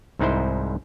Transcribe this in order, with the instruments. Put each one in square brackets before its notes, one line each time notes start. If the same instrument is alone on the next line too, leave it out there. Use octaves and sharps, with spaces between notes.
[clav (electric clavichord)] C2 G#2 D#4 E4 C5